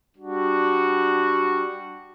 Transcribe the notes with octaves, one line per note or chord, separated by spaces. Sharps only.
G3 D4 F#4